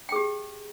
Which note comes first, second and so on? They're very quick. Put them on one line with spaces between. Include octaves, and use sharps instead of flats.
G5 G#4 G4